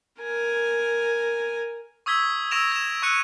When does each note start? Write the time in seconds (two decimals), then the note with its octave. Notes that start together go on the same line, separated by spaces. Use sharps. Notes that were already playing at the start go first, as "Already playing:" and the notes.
0.21 A#4 G#5
2.06 C#6 D#6 E6 G#6 B6 G7
2.51 C#6 E6 A#6 D7 E7 F7
2.72 G#6 E7
3.02 C#6 E6 F#6 C#7 D#7